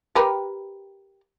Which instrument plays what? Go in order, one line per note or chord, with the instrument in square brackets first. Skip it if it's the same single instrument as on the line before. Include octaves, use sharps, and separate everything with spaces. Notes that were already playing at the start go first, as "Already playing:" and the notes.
[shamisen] G4 A#4 B4